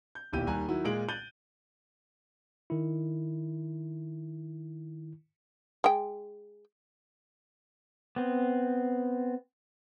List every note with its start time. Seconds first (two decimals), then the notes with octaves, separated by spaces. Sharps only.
0.15 G6
0.33 D#1 B1 E4 G4 G6 D#7
0.47 D#2 G3 G#5 A#5 F#6
0.68 D#3 F#3 E4
0.85 A#2 G#3 F4 G#4 D7 F#7
1.09 F#6 G6 A6 D#7 F#7 G7
2.70 D#3 E4
5.84 G#3 G5
8.16 B3 C4